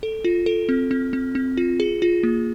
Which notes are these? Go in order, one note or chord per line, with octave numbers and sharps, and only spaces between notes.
A4
F4
A4
C4
C4
C4
C4
F4
G#4
F4
A#3